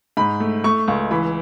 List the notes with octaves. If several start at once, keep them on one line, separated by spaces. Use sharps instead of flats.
G#2 B5
A3
A3 C#6
C#2
E3 B5